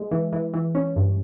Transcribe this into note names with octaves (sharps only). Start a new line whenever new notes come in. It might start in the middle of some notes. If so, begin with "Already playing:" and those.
Already playing: G#3
E3
E3
E3
C#4
G2